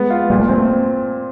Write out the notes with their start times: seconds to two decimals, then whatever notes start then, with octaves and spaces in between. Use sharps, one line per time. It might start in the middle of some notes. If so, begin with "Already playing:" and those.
Already playing: G#3 B3
0.10 F4
0.30 A#2 G3
0.40 A3
0.49 G#3 C4
0.58 A3